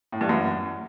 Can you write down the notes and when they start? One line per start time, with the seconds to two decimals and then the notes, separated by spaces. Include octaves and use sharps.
0.12 A2
0.21 G2
0.29 F#2